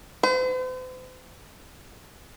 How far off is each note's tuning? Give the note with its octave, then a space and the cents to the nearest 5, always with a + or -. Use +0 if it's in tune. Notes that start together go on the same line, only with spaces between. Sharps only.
C5 -45